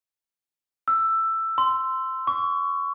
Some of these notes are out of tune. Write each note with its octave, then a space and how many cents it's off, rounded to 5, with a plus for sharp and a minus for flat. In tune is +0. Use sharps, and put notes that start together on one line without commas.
E6 +10
C6 -10
C#6 +25